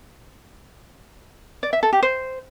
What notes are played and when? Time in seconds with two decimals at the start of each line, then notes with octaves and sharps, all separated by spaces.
1.63 D5
1.73 E5
1.83 A4
1.93 G4
2.03 C5